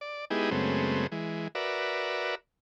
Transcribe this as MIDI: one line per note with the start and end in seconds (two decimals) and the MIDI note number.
0.01 0.25 74
0.30 0.50 56
0.30 0.50 59
0.30 0.50 63
0.30 0.50 64
0.30 0.50 67
0.30 0.50 68
0.51 1.07 42
0.51 1.07 49
0.51 1.07 56
0.51 1.07 57
0.51 1.07 59
0.51 1.07 60
1.12 1.48 52
1.12 1.48 56
1.55 2.35 66
1.55 2.35 70
1.55 2.35 71
1.55 2.35 74
1.55 2.35 76